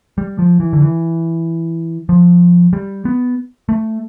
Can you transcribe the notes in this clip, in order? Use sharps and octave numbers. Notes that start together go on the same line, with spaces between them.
G3
F3
E3
D3
E3
F3
G3
B3
A3